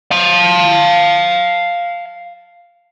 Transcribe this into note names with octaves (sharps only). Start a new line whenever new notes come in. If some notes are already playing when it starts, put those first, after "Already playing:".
F5 A5